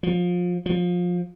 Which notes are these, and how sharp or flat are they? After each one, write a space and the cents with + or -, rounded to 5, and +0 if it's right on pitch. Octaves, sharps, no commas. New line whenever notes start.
F3 +25
F3 +20